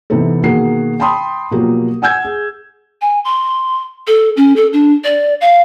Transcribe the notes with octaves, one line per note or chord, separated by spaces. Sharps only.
C3 E3 B3 C4 D#4 A4
B2 D#3 A#3 G#4 F#5 C7
G5 A5 B5 C6 D#6
B2 F3 F#3 A#3 F#4 G4
F#5 G#5 E6 G6 G#6
G#4
G#5
C6
A4
C#4
A4
D4
D5
F5